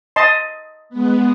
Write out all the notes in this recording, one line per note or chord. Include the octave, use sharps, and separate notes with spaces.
D#5 A5 C6
G#3 B3